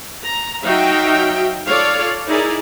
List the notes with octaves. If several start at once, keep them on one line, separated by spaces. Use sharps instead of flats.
A#5
F#3 D#4 F#4 E5 F5 G5
F4 A4 C#5 D5 F5
D#4 E4 G#4 A#4 D5